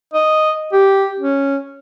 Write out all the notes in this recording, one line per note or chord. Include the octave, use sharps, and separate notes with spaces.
D#5
G4
C#4